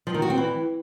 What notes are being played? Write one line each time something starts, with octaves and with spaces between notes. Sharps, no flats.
F3
D#3
F#4
C4
E3